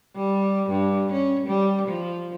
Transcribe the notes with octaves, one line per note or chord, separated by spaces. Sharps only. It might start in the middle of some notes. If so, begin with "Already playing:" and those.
G3
G2
C#4
G3
F3